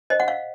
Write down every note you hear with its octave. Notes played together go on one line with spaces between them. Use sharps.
C5 D#5
F#5
F5